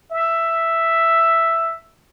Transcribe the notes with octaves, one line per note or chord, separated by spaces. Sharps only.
E5